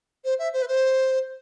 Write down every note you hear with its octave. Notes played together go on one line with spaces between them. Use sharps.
C5
E5
C5
B4
C5